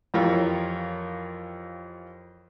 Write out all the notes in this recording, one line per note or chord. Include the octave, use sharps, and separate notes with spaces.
F2 E3 F4 G4 A#4 C#5